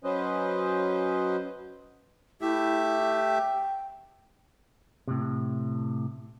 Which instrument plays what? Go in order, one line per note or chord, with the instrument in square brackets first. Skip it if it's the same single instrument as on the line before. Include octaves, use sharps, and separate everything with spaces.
[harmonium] F#3 C#4 B4 C5 D#5
[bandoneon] A3 G4 E5 [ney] E4
[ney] G5
[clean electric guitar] A2 C3